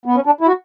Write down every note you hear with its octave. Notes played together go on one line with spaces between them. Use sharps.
B3
C#4
D4
E4
F#4